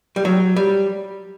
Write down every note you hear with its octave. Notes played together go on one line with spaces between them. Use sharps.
G3
F#3
G3